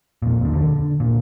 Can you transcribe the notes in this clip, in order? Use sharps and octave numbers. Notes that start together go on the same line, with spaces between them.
F2 A#2
D#2 D3
D3
A#2